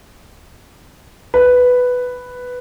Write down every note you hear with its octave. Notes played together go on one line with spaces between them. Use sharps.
B4